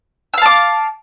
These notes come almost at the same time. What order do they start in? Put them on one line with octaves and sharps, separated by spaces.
E6 F5 A5 D6